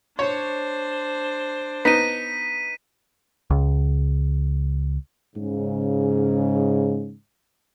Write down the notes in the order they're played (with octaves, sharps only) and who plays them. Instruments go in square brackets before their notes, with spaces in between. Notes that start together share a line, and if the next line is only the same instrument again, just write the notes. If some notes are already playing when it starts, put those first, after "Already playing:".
[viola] D4 C5 [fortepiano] C#5
[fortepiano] B3 D#4 [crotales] B6 D#7
[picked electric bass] C#2
[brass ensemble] G#2 C#3